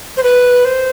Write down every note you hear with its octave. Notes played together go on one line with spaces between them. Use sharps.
C5
B4
C5